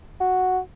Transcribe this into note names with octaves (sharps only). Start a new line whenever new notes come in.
F#4